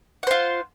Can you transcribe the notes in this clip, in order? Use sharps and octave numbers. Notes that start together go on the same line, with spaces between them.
F4 C5 F#5